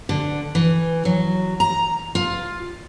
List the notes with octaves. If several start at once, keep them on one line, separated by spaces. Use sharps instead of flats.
D3
E3
F#3
A#5
F4